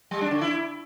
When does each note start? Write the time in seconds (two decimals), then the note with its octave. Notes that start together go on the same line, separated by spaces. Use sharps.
0.11 G3
0.21 D4
0.31 D3
0.41 E4